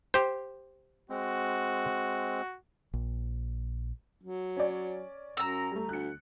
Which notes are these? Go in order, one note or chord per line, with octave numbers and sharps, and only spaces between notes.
G4 C5
G#3 C4 F#4
A#1
F#3
C#4 D5
F#2 A#5 E6
G3 A3
D2 F#6 C#7